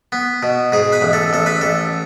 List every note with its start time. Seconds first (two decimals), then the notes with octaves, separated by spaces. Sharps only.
0.12 B3
0.43 B2
0.72 G#2 G#4
0.93 B4
1.02 A1
1.13 A4
1.33 A1 A4
1.46 B4
1.61 A1 A4